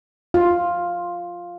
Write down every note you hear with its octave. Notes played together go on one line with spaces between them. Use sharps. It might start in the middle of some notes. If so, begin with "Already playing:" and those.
F4